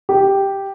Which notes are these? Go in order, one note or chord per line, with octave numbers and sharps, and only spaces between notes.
G4